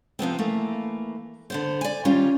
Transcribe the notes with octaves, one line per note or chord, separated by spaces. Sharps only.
C3 F3 B3 C4
E3 A3 A#3
D3 B3 C5
D5 G#5
D#3 G3 C#4 F4 G4